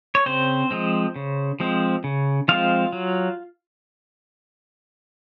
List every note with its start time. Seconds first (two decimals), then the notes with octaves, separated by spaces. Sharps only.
0.15 C#5
0.26 C#3 C4 C5
0.71 F3 G#3 C4
1.16 C#3
1.60 F3 G#3 C4
2.04 C#3
2.48 F3 G#3 C4 F4 F5
2.93 F#3